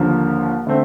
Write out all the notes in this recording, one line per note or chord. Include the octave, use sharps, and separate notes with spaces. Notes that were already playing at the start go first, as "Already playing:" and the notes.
Already playing: D#2 D3 F3 A#3
D3 A3 C4